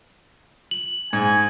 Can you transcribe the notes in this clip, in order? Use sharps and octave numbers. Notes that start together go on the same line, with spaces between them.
F#7
G#2 G#5 G#6